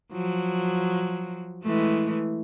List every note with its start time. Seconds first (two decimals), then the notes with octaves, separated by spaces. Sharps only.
0.12 F3 F#3
1.63 E3 G#3 A3